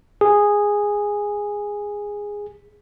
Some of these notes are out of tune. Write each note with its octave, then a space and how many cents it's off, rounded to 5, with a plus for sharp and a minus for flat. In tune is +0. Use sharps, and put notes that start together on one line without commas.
G#4 -10